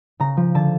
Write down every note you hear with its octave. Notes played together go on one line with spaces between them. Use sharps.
C#3 A#5
F3
D3 A5